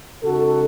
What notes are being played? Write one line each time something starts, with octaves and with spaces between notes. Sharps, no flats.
C#3 G#3 D#4 F#4 A4